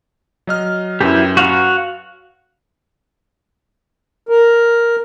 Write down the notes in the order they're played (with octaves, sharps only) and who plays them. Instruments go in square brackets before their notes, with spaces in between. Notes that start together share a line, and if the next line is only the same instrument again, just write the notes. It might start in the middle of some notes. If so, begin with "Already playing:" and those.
[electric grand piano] F#3 D#5 F6
[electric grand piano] F#2 B4 [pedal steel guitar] E4 G4
[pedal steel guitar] F#4 F5 F#5
[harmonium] A#4